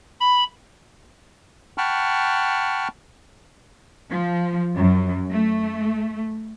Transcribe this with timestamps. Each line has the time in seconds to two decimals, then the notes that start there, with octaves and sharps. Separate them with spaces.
0.20 B5
1.78 F#5 G5 A5 B5 C#6 F6
4.10 F3
4.75 F#2
5.33 A3